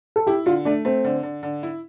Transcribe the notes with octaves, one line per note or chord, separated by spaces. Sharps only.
A4
E4 G4
D3 F4
A3 D4
A3 C4
D3
D3
D3
E4